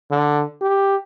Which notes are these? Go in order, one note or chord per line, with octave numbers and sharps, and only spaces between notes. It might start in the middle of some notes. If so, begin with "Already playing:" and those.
D3
G4